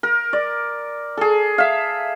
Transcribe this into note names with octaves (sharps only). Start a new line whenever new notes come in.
A#4
D5
G#4 A4
E5 F5